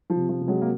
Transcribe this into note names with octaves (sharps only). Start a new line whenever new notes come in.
F3
C3
F3
C3
F#3 G#3
A#3